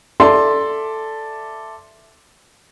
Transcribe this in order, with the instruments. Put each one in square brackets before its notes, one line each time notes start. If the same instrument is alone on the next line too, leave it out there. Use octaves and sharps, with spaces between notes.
[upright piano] A4 D5 E5 C6